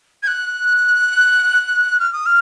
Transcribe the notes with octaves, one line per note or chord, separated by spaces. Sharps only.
G#6
F#6
F6
D#6
F6